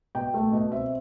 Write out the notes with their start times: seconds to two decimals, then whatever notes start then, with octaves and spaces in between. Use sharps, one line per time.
0.15 B2 G5
0.34 A3
0.52 B2
0.71 C4 E5